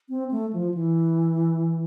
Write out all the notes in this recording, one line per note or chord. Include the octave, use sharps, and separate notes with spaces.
C4
A3
F3
E3